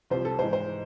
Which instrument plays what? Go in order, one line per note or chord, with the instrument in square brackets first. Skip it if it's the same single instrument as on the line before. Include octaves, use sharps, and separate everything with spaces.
[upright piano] C2 C3 F3 C5
A4
G#2 C5
E3
C5